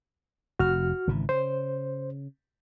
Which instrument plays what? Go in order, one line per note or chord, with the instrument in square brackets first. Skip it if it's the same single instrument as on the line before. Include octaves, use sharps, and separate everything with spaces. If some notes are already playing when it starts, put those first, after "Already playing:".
[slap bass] F1 [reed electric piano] F#4 F6
[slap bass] G#1 C#3 E3
[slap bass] C#3 [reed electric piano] C5